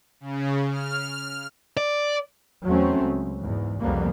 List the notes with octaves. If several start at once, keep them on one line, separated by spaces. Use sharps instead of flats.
C#3
F6
D5
E2 F#3 A3 C4 C#4
C#2
E2 G#2
C2 F2 C#3 G3 A#3 B3